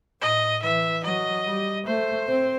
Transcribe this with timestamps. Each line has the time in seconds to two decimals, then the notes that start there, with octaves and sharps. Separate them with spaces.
0.21 A2 D#5
0.62 E3 E5
1.04 F#3 D#5
1.46 G3
1.86 A3 C5
2.28 C4